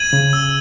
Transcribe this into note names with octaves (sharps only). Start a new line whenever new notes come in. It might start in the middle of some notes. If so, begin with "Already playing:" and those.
Already playing: G#6 D#7 F#7
C#3
E6